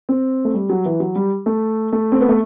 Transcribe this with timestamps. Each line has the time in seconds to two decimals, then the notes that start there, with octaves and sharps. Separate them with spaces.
0.09 C4
0.45 A3
0.54 G3
0.70 F#3
0.85 E3
1.00 F#3
1.15 G3
1.46 A3
1.93 A3
2.12 C4
2.21 B3
2.29 A3